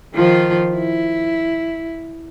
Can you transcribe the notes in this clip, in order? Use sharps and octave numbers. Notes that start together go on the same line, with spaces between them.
D#3 F3 F4
E4